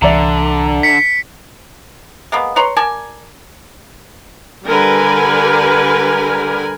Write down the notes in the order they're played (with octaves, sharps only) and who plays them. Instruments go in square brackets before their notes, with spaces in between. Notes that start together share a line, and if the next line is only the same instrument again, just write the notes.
[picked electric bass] C2 E3 [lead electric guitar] D3 [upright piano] D5 E5 A#5
[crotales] B6 C#7
[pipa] G#3 A#3 B3
B4 C#5 A#5 C6
A#4 D5 G#5 A5
[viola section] D3 G3 A#4 B4 G#5